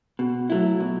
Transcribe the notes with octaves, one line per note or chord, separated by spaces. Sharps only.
B2
F#3 A3 E4
B2